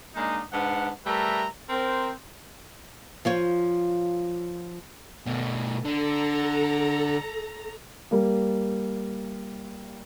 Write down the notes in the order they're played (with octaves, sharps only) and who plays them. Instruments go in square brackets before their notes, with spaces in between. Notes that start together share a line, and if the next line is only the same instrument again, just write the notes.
[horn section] G#3 A#3 D4 D#4
G#2 D4 B4 F#5
G3 A3 A#4 B4 E5 A#5
C4 A#4 C5
[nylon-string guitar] F3 F4 C#5
[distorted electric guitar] B2 A3
[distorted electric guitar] D3 [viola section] A4 A#5
[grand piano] G3 A#3